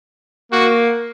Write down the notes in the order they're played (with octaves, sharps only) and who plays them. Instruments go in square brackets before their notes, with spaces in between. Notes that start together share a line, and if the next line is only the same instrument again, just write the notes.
[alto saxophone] A#3 [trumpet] F#4